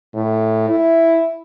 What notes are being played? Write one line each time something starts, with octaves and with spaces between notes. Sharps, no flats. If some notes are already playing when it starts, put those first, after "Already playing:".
A2
E4